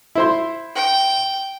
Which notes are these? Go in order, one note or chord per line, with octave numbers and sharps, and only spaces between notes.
E4 C5 C6
G5